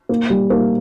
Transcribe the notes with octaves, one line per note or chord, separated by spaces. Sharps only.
A#3
G3
A#3